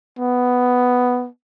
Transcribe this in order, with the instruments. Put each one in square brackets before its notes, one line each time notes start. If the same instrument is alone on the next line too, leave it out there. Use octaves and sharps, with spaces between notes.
[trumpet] B3